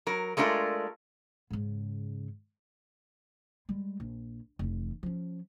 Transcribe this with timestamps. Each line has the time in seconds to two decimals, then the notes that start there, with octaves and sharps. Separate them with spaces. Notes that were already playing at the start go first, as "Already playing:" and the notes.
0.07 F#3 A#4
0.37 G#3 A3 D4 F4 A#4
1.51 G#2 C#3
3.69 G3 G#3
4.00 A#1
4.59 F1 E3
5.03 F3 C#4